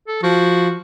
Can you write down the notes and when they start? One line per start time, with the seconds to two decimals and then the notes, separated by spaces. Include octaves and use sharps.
0.08 A4
0.23 F3 F#4